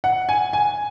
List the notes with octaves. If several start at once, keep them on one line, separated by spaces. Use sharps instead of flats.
F#5
G#5
G#5